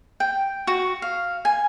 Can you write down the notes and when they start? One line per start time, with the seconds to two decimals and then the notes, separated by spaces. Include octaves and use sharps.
0.20 G5
0.67 F#4
1.02 F5
1.45 G#5